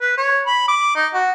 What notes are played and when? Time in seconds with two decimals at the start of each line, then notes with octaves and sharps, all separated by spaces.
0.01 B4
0.17 C#5
0.46 B5
0.68 D6
0.95 D#4
1.14 F#4